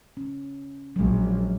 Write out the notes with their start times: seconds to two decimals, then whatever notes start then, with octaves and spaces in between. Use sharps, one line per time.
0.17 C#4
0.96 A#1 F#3 G#3